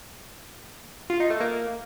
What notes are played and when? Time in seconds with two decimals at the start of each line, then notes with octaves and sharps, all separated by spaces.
1.10 F4
1.20 D#4
1.30 A3
1.41 A#3